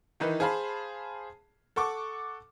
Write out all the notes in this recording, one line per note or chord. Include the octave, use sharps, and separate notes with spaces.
D#3 E3 D#4 B4
G#4 C5 F5 A5 B5
A4 F#5 C#6 D6